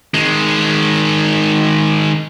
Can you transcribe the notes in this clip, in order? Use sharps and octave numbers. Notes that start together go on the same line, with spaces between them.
D#3 G#3